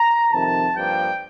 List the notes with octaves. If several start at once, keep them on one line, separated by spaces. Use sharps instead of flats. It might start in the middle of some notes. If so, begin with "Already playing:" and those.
Already playing: A#5
F2 C3 D#3 A5
G2 F3 A#3 G5